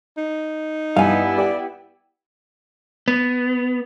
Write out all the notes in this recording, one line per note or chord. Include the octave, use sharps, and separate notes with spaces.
D#4
G2 B3 E4 F5 G#5
G4 D5
B3